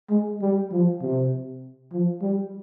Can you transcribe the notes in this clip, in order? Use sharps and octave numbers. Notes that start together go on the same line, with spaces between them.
G#3
G3
F3
C3
F3
G3